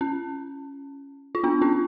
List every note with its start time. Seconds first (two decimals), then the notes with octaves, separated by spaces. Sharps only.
0.01 C#4
1.35 F4
1.43 B3 D4
1.62 C#4 F4